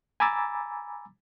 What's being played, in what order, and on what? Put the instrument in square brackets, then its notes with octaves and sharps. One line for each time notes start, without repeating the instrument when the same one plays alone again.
[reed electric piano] G#5 A#5 B5 D6 E6 A6